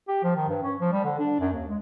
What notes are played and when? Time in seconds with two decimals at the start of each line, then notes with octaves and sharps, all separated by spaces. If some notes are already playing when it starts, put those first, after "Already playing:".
0.08 G4
0.23 F3
0.36 D#3
0.49 G2
0.63 C#4
0.80 F3
0.92 G3
1.05 D3
1.19 D4
1.40 F#2
1.53 D#2
1.68 G#3